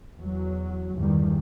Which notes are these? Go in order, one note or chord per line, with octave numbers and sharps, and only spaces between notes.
E2 F#3
E2 G2 D#3 G3